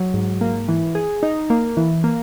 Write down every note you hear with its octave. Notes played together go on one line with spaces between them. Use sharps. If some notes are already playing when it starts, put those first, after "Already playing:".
Already playing: F#3
G#2
A#3
E3
G#4
D#4
A#3
E3
A#3